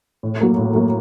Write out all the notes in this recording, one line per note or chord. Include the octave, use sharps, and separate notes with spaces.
A2
F#3 A#3
A2
F#3 A#3